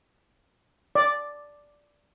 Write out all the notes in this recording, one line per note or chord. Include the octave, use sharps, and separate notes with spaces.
D5